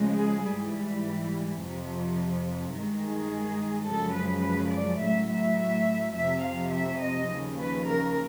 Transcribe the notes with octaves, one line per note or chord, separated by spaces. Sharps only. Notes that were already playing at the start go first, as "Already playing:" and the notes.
Already playing: D2 C#3 F3 G#3
G#4
G#2 E3 G3
F2 C3 F3
G2 D#3 G#3
G#4
F#2 C#3 F3 G#3 A4
B4
B4
D5
A2 F#3 E5
E5
F2 C3 F3 E5
F5
E5
D#5
D#2 C#3 F3
B4
A#4